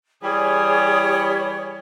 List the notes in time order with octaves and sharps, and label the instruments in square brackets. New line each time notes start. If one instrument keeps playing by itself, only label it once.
[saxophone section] E3 G3 [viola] G#4 [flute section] C#5